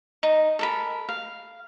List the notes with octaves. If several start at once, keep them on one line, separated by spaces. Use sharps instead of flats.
D#4
A4 A#4 B5
F5